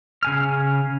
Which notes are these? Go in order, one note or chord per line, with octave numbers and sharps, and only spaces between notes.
C#3 G#5 F6